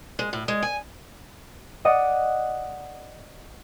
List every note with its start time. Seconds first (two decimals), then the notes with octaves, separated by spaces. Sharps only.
0.19 G#3
0.33 A2
0.48 G#3
0.62 G#5
1.85 D5 D#5 F#5 D#6